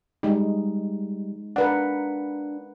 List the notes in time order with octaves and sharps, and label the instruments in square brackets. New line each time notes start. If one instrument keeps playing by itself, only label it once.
[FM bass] G3 [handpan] G#3 D#4
[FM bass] D4 [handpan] A#4 B4 F#5